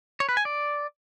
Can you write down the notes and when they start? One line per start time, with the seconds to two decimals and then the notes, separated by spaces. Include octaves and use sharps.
0.20 C#5
0.29 B4
0.37 G#5
0.45 D5